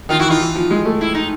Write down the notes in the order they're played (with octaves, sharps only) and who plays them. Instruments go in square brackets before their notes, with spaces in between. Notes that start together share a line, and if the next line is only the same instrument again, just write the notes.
[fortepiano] D#3 [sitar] D#4 F4
[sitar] E4 F#4
[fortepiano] E3
[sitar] D#4 F4
[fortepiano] E3
F3
G#3
A3
[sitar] E4
D#4